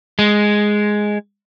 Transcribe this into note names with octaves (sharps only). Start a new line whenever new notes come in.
G#3